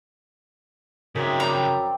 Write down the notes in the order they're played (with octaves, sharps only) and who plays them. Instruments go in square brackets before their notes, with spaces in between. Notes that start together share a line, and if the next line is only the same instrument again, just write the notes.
[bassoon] F#2 [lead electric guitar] C#3 E5 [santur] C4 D#4 G#4
[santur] F3 D5 G5 [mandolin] A#5 B5